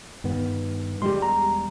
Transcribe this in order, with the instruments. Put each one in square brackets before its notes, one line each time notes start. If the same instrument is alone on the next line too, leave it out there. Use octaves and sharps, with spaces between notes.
[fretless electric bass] G2 D#3 B3
[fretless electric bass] E1 G3 G#3 [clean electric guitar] G4 C6
[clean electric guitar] A#5